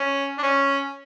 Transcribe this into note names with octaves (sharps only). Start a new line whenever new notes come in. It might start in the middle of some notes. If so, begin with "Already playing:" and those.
Already playing: C#4
D4
C#4